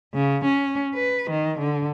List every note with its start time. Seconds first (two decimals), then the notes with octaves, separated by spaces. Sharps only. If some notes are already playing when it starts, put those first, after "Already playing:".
0.14 C#3
0.45 C#4
0.94 B4
1.30 D#3
1.59 D3